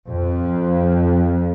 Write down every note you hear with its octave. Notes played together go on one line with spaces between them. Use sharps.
F2